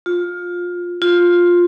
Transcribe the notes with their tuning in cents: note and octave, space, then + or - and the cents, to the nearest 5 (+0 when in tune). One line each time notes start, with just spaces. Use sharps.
F4 +15
F4 +10